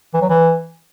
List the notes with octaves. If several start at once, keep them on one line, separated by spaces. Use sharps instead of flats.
E3
F#3
E3